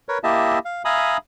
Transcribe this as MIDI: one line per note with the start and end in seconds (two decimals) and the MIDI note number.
0.09 0.18 70
0.09 0.18 71
0.09 0.18 73
0.24 0.59 58
0.24 0.59 64
0.24 0.59 67
0.24 0.59 75
0.24 0.59 76
0.24 0.59 81
0.65 0.82 77
0.85 1.17 76
0.85 1.17 77
0.85 1.17 80
0.85 1.17 82
0.85 1.17 83
0.85 1.17 87